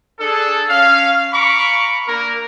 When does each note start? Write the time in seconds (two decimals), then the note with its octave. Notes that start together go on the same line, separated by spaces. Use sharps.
0.20 D4 G#4 A4
0.70 C#4 F5
1.33 F5 A#5 B5 C#6 D6
2.07 A#3 D4 A#4